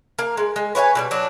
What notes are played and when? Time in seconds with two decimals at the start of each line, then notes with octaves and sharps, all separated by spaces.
0.19 A#3 F5
0.37 G#3
0.56 G#3
0.75 B4 C#5 E5 G#5
0.95 B2 F#3 G3
1.11 F#3 D4